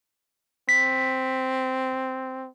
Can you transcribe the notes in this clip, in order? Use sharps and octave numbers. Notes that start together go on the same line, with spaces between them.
C4 B6